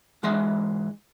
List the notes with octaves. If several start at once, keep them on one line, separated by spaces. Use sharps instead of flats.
G#2 E3 G#3 D#5 E5 C6